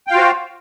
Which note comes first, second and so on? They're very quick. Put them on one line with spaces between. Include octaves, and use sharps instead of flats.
G5 F5 F4 F#4 C5